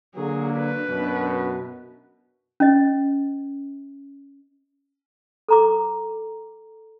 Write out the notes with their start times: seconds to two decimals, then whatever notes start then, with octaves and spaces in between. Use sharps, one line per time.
0.16 D3 F#3 A#3 G#4
0.53 D4 B4
0.89 F#2 B2
2.60 C#4 D#5
5.49 A4 A#5 D6